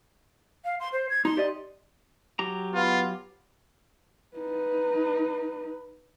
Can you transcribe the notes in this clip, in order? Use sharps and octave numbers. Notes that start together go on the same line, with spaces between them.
F5
C6
C5
G#6
D#4 C6
G4 D5 D#5
F#3 G4 A#5
B3 F4
D#4 B4